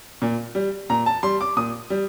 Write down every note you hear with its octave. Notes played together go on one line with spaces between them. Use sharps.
A#2
G3
A#2 A#5
A5
G3 C6
D6
A#2 D#6
G3